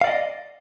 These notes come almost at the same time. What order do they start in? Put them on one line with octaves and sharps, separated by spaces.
F5 D5 D#5